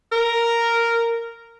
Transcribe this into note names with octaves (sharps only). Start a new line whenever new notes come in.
A#4